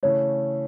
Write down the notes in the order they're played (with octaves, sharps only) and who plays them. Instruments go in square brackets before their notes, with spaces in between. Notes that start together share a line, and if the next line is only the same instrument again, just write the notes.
[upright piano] C#3 E3 A3 [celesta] C#5